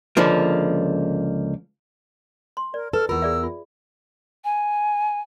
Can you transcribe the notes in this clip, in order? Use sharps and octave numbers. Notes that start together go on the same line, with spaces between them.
C#2 D3 F3 A#3
C6
A#4 D5
A4 B4 F6
E2 F4 A#4 E6
G#4 D5 E5
F4
G#5